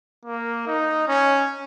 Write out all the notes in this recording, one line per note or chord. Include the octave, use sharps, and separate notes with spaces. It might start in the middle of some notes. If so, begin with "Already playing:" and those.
A#3
D#4
C#4